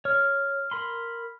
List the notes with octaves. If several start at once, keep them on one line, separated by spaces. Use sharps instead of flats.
C#5 F6
A#4 B5 C6